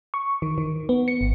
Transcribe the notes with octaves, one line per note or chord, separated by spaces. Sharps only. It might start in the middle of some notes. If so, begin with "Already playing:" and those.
C#6
D#3
D#3
B3
C#7
G#1